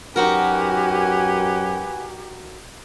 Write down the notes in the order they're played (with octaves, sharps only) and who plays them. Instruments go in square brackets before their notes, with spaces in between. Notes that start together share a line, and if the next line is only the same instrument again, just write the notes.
[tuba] F#2 [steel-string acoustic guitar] D#4 F#4 A#4 [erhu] G4 [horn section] B4 F#5 G#5